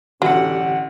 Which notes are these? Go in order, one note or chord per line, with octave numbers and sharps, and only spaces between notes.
A1 D3 F#3 G4 F#5